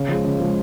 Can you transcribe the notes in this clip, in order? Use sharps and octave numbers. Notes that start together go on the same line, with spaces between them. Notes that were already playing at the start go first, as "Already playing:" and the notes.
Already playing: C#3
F3 G#3
C#3
F3 G#3